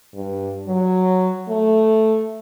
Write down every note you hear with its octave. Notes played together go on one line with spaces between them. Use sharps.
G2
F#3
A3